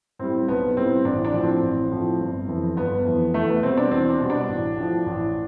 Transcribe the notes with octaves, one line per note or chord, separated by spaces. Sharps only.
A2 G3 C4
B1 B3
A2 G3 C4
A1 D4
D4
A2 F3
C4
A1
A2 F3
G1
F2 E3
G1 B3
F2 E3
E2 A3
B3
B2 G3 C4
D4
E2 C4
D4
B2 G3
D4
A1
A2 F3
A1